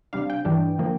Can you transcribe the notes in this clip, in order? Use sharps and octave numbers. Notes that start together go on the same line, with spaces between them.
C3 G3 D4 F5
G5
G2 E3 G3 D4
D3 F3 A#3